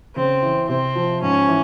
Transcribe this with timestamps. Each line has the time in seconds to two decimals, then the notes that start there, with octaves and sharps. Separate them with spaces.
0.16 C#3 C4
0.42 E3
0.69 C3 C4
0.95 F3
1.22 G#2 C#4
1.48 E3